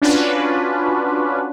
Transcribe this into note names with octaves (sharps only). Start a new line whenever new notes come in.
C#4 D4 F4 F#4 B4